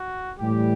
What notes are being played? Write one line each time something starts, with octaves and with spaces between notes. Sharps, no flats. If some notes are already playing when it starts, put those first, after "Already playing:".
Already playing: F#4
A2 E3 G3 G4